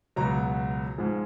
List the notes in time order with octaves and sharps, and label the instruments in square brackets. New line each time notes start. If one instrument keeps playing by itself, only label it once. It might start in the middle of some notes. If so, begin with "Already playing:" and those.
[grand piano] C#2 B2 F#3 A#5
G#2 F3 G#3